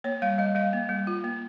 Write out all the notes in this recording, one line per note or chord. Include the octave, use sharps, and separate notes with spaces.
A#3 C#5
G3 F5
G3 D#5
G3 F5
A#3
G3
F4
A#3